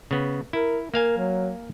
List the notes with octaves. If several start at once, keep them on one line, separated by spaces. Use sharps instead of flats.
C#3 B3
E4 A#4
A#3 A#4 F5 G#5
F#3